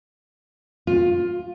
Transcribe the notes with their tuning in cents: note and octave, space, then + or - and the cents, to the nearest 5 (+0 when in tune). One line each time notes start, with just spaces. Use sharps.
F4 +15